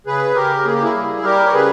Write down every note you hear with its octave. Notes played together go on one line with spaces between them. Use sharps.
C#3 G#4 B4
C#3 G4 A#4
A#3 G#4
G4
E4 G#4
G3
G3 G4 A#4
C#5
C#3 G#4 B4